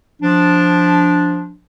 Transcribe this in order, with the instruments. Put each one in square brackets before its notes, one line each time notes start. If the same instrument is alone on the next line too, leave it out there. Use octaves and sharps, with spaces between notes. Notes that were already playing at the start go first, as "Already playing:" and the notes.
[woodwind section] F3 D4